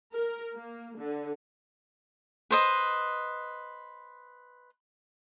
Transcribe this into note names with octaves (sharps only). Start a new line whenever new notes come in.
A#4
A#3
D3
B4 C5 D#5